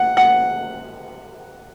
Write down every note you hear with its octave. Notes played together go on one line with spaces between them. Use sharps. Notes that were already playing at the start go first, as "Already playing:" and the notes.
Already playing: F#5
F#5